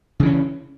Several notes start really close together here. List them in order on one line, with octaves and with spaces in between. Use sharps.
C#3 E3 C#4